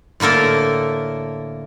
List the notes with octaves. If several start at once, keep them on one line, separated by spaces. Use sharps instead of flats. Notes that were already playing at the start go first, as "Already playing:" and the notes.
A2 D3 A#3 A4 A#4